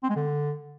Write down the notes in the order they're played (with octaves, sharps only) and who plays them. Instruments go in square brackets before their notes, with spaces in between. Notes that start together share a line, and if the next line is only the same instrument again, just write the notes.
[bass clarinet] C4
G#3
D3